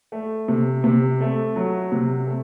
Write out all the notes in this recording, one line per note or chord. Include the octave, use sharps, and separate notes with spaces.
A3
C3
C3
A3
F#3
C3
A3